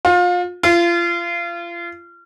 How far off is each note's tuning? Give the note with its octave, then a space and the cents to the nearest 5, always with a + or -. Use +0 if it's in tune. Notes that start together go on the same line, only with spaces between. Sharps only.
F4 +30
F4 -30